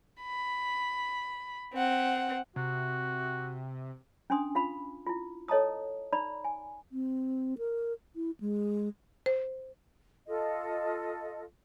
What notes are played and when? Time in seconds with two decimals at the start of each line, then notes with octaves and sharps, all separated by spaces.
0.22 B5
1.74 C4 F#5
2.56 C3 F#4
4.30 C#4 D4 G#5 C6 D#6
4.55 F4 F5 B5
5.06 E4 F4
5.48 A4 C#5 D#5 A5 A#5 D#6
6.13 D#4 D5 A#5 B5
6.45 G#5
6.91 C4
7.58 A#4
8.16 E4
8.40 G#3
9.26 C5
10.27 F4 A4 D#5